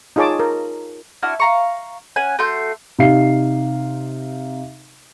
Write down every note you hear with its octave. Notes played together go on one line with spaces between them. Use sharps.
D#4 F4 G#4 C#5 A5 D6
A#4
D4 E4 F#4 F6
F5 A#5 C#6
C#4 F#5 G#5
A3 F#4 C6 G6
C3 D#4 F5 C7